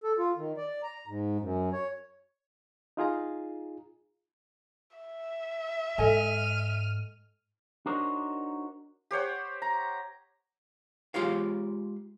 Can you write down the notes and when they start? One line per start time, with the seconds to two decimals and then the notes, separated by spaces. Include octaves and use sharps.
0.04 A4
0.18 F4
0.37 D#3
0.57 D5
0.83 A#5
1.07 G#2
1.40 F#2
1.73 C#5
2.97 D#4 F4 G#4 A#5
4.97 E5
5.98 G#2 A4 D#5 G#5 F6 D#7
7.86 D4 D#4 F#4 A#4 C5 C#5
9.11 G4 C5 C#5 F#5
9.62 A#5
11.14 G#3 F4 G4 C#5 F5